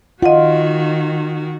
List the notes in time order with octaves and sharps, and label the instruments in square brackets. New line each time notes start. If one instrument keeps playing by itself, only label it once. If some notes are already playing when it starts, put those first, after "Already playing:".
[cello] D#3 F#4 [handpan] F4 [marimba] D#5 F#5